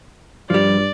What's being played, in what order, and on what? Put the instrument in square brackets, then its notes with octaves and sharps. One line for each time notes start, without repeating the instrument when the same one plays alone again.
[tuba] G2 [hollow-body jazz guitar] F3 G3 [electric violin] D5